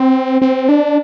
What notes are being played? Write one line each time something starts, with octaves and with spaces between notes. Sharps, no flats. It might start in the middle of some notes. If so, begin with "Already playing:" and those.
Already playing: C4
C4
D4